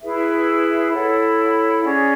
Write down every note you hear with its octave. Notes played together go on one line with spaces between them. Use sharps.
E4 G#4 B4 E5
E4 A4 C#5 F#5
C#4 G#4 D5